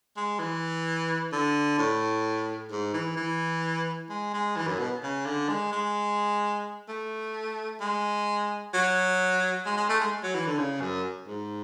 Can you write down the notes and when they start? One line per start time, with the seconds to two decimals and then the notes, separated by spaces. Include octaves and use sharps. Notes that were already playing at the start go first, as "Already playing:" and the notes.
0.17 G#3
0.39 E3
1.32 D3
1.79 A2
2.71 G#2
2.94 E3
3.17 E3
4.10 G#3
4.34 G#3
4.56 E3
4.67 F#2
4.79 B2
5.03 C#3
5.26 D3
5.49 G#3
5.72 G#3
6.88 A3
7.80 G#3
8.74 F#3
9.66 G#3
9.77 G#3
9.89 A3
10.00 G#3
10.23 F#3
10.35 E3
10.47 D3
10.58 C#3
10.81 F#2
11.27 G#2